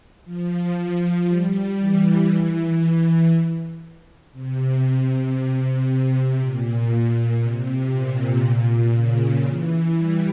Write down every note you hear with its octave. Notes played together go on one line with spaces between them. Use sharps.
F3
G3
E3
C3
C3
A#2
C3
A#2
C#3
E3
G3